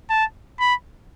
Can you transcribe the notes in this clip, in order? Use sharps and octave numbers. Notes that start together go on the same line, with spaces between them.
A5
B5